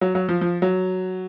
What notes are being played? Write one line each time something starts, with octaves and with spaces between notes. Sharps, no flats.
F#3
F#3
F3
F3
F#3